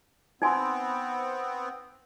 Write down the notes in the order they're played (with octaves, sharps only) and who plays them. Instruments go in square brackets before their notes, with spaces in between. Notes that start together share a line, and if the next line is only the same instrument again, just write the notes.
[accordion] B3 C4 [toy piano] D#4 G#5 C6